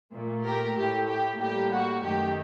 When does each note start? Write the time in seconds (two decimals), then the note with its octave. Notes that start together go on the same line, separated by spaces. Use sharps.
0.13 A#2 A3
0.45 G4 A#4
0.76 A2 A3 G4
1.09 G4
1.40 A2 G3 A#3 G4
1.73 F#4
2.04 F#2 D#3 A3 G4